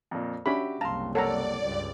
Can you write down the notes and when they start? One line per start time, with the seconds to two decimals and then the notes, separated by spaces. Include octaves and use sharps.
0.11 F2 A#2
0.46 C#4 D4 F#4 G4 E5 B5
0.81 F#1 C2 F5 A5 A#5 C6
1.15 A4 A#4 C#5 D5 F#5 A#5
1.62 C#2 G2